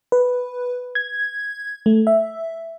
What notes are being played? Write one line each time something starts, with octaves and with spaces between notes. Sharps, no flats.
B4
G#6
A3
E5